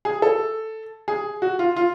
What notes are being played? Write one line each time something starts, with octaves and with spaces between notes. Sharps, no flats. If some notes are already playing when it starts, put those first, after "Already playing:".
G#4
A4
G#4
F#4
F4
F4